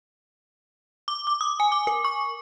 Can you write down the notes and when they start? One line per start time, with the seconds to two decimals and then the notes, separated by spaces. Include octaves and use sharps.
1.08 D6
1.27 D6
1.41 D#6
1.60 G#5
1.72 D6
1.87 A#4
2.05 C#6